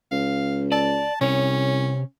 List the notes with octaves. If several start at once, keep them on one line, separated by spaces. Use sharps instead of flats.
C#2 F5
D5 A5
C2 C3 C#4 C#5